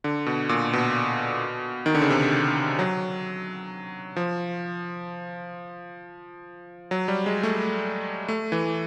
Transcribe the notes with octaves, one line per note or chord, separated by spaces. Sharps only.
D3
B2
A#2
B2
D#3
D3
C#3
C3
F#3
F3
F#3
G3
G#3
A3
A3
E3